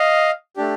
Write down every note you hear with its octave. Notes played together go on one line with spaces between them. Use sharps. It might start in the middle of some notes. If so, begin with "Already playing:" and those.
Already playing: D#5 F5
A3 D4 G4